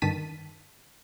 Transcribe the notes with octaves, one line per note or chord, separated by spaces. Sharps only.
G2 D3 D#3 A5 B6 D#7